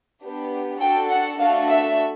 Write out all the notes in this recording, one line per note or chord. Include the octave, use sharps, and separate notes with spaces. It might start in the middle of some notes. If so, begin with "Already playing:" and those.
B3 D4 G4
D4 F#4 A4 G5
F#5
A3 D4 F#4 A4 F5
E5